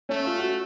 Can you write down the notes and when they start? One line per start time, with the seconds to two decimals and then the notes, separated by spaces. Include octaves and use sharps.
0.09 A3 C#4
0.25 F4
0.39 F#4